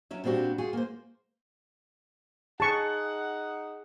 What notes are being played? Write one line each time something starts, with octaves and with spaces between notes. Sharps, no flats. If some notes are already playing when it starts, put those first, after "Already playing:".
F#3 C#4 E5
A#2 G3 C4 D4 F#4 G4
F4 F#4 G#4
A#3 C5
D#4 G#4 F#5 A5 C#6